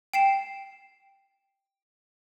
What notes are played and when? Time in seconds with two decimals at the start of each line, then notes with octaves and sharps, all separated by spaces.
0.14 G5 C7 E7